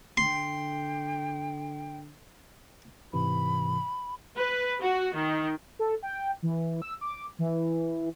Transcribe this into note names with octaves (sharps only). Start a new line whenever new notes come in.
D3 G5 C6
G#2 C3 E3 B5
B4
F#4
D#3
A4
G5
E3
E6
D6
E3